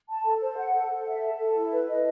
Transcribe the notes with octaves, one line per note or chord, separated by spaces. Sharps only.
A5
A4
C5
F#5
A4
A4
E5
A5
A4
E4
B4
D#5